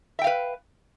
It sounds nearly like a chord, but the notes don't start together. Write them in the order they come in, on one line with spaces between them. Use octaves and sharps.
E5 G5 F5 B4